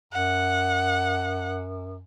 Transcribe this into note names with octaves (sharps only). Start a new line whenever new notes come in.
F#2 F#5